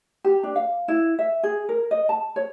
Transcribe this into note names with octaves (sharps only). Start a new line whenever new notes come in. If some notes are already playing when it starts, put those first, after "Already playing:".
G4
D4
F5
E4
E5
G#4
A#4
D#5
A5
C#5